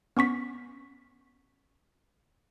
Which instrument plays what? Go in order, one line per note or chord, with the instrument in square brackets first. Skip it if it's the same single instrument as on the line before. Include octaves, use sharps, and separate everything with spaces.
[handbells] B3 C#4 C#6 B6